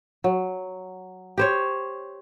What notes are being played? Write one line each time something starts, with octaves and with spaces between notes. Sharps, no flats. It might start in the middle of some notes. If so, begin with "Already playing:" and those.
F#3
G4 C5 C#5